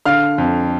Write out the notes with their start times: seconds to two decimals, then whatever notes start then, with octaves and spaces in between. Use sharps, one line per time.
0.06 D3 F5 F6
0.38 F2